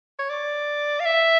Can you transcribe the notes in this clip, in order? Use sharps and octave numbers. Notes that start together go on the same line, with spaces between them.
C#5
D5
F5
E5